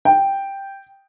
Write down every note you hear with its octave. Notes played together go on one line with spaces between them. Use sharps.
G5